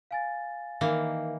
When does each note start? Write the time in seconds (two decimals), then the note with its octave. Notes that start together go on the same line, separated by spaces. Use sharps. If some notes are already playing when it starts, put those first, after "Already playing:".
0.11 F5 G#5 A6
0.81 D#3 E3 A#3 D#4 A#4 F5